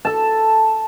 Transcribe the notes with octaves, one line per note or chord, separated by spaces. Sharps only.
A4 A5